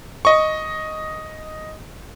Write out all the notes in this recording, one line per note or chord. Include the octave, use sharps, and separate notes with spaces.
D#5 C#6